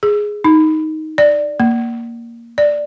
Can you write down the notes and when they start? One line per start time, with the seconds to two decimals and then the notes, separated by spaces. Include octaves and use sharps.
0.03 G#4
0.44 D#4
1.18 D5
1.60 A#3
2.58 D5